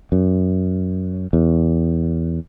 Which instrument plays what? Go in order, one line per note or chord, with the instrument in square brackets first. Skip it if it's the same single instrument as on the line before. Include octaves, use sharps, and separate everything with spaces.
[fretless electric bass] F#2
E2